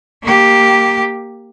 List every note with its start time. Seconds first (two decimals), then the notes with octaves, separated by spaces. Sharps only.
0.23 A#3 G4